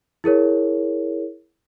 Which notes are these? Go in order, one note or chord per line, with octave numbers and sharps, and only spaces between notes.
E4 G#4 A#4 C#5